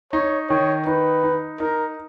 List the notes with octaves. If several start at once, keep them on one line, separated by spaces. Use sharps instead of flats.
D#4 C#5
D#3 C#5
D#4 B4
D#4
D#4 A#4